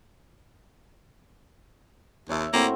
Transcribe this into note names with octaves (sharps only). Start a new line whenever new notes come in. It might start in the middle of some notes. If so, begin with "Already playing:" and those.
D#2 C#5 E5
A2 A#3 C4 F#4